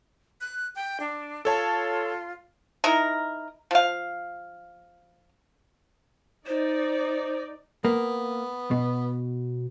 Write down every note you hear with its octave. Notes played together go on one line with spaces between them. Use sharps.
F#6
G5
D4
F4 A4 C#5 A5
D#4 E4 A#4
F3 F5
D#4 C5 D5
A#3 B3
B2